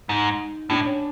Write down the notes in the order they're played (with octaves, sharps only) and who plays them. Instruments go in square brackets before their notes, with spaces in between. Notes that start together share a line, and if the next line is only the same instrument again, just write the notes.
[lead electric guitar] G#2 [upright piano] D#4
[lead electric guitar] A2 [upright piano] D4
[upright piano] C#4